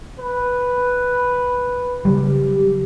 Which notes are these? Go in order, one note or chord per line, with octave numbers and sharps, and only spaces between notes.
B4
C#3 F#3 G3 G4